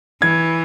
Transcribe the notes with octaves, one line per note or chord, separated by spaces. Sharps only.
E3 G#6